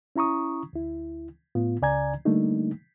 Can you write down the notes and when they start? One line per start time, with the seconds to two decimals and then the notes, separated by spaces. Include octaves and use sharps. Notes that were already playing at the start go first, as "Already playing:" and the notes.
0.16 C#4 E4 A#5 C#6 D#6
0.73 D2 E4
1.55 A2 B3 F4
1.82 C#2 C#3 D5 G#5 A#5 G#6
2.25 D3 G3 A3 A#3 D4 D#4